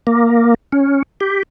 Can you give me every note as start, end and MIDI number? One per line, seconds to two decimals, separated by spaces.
0.07 0.54 58
0.72 1.02 61
1.21 1.43 67